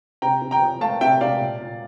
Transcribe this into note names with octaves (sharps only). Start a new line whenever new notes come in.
C3 G5 A#5
C3
G5 A#5
F3
A3 F5 A5
C3 E5 G5
C3 D5 F5
A#2
A#2